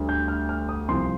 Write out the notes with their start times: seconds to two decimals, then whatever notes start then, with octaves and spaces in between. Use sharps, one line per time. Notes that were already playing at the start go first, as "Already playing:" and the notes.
Already playing: D2 D3 G3
0.09 G6
0.28 F6
0.49 F6
0.69 D#6
0.88 C2 C3 F3 C6